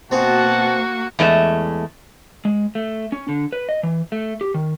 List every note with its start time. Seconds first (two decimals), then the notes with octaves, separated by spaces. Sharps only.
0.11 B2 A#3 C4 F#4 G#4 F#5 A5
1.19 E2 G#3 A3 F4 E5
2.45 G#3
2.75 A3
3.12 C#4
3.29 D3
3.53 B4
3.69 D#5
3.83 E3
4.12 A3
4.41 G4
4.54 D#3